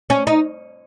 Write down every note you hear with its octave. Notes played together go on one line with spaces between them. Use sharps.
C#4
D#4